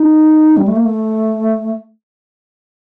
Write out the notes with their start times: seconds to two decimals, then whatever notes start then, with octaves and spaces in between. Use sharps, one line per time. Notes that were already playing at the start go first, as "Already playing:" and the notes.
Already playing: D#4
0.57 G3
0.68 A3
0.76 A#3
0.85 A3